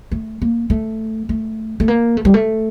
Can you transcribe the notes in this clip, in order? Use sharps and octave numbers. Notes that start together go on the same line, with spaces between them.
A3
A#3
A3
A3
A3
A#3
A3
G3
A3